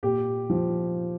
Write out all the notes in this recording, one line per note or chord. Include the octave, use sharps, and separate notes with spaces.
A#2 G4
F3